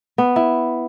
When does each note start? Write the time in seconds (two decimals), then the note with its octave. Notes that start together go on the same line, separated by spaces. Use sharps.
0.18 B3
0.36 E4